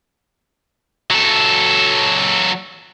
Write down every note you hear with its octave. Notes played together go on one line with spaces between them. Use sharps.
F#3 A4